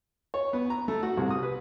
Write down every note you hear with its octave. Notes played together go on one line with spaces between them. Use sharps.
C#5
B3
A#5
A3
F#4
C2
D#6
B4